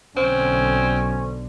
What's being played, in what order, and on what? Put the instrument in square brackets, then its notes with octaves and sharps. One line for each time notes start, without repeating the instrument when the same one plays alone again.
[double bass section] B1 D3 [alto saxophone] C4 [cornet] C#4 [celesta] C5